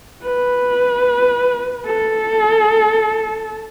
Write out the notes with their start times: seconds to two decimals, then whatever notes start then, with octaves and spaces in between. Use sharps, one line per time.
0.23 B4
1.86 A4